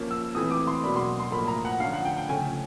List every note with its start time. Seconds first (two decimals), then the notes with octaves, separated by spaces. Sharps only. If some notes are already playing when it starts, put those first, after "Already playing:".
Already playing: F3 A#3 C#4
0.11 E6
0.35 E3 A3 C4 D#6
0.51 D6
0.67 C6
0.83 B2 F#3 A#3 D4 B5
0.96 C6
1.20 C6
1.32 A2 F3 A#3 B5
1.48 A#5
1.65 F#5
1.80 D3 F3 A3 C#4 F5
1.93 F#5
2.05 G5
2.17 G5
2.29 C#3 F3 A3 C#4 G#5